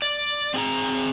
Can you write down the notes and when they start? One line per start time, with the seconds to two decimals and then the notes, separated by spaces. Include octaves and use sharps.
0.02 D5
0.54 C4 G#4 G#5 A#5